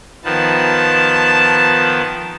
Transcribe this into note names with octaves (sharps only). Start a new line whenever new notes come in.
D#3 F3 B3 A5